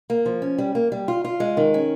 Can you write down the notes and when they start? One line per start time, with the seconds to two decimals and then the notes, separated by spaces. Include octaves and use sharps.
0.10 A#3
0.26 F3
0.42 C#4
0.58 G3
0.75 A#3
0.92 G3
1.08 F4
1.25 F4
1.40 G#3
1.57 D#3
1.74 C#4